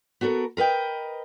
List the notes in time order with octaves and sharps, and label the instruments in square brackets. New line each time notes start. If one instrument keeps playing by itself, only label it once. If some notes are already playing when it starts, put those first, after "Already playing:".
[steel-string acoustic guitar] B3 F#4 A4 A#4
A#4 B4 D#5 G5